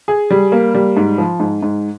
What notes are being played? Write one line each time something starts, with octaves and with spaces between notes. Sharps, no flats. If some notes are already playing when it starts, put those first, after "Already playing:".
G#4
G3
A#3
G3
G#2
F3
G#2
G#2